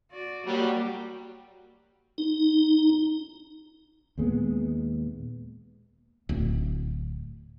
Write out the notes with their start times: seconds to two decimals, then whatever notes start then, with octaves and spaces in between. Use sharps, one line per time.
0.11 F#4 D5
0.47 F#3 G3 A#3 G4
2.18 D#4
4.18 D#2 A#2 G#3 B3
6.29 D1